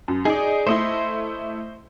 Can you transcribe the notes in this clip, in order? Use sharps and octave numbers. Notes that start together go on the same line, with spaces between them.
F#2
D#4 G#4 D5
A3 E4 C5 D#5 C6